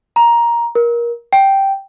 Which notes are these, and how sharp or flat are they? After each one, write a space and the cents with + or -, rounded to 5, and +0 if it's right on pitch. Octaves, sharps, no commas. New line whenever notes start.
A#5 +10
A#4 +20
G5 -5